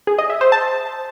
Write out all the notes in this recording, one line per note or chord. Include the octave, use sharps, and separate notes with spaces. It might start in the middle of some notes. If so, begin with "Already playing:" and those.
G#4
D#5
E5
C5
A5